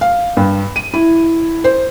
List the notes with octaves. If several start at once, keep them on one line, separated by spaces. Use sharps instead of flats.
F5
G2
D#7
E4
C5